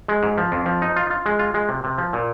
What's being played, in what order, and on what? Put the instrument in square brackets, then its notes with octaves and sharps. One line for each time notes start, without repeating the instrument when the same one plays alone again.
[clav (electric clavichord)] G#3
G#2
F3
F2
F3
D#4
F4
F4
G#3
F4
G#3
C3
C3
F3
A#2